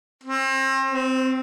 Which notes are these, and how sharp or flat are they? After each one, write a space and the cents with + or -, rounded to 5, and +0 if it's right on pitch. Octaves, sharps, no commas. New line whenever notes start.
C4 +35
C4 -10